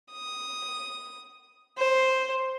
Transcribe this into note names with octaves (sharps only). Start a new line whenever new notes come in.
D#6
C5